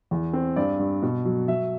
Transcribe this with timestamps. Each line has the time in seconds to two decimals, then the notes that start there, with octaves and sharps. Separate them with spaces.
0.11 E2
0.33 C4
0.56 G2 D5
0.79 G2
1.03 B2
1.25 F#3
1.48 F#3 E5